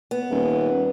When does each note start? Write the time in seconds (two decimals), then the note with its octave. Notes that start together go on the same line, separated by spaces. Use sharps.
0.11 B3
0.30 D#1